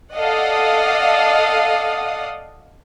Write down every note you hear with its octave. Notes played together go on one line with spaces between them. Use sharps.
A4 D5 D#5 F5 F#5 D#6